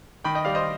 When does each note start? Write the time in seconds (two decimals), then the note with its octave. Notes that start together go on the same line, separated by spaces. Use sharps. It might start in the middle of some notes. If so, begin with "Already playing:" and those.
0.24 D#3 G5 B5
0.35 D#5 G5
0.45 G3 D5 F5
0.55 C5 D#5